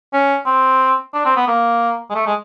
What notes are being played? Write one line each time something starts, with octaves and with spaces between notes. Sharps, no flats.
C#4
C4
D4
C4
B3
A#3
G#3
A3
G#3